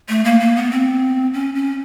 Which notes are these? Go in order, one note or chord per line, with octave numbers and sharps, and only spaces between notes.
A3
A#3
A#3
B3
C4
C#4
C#4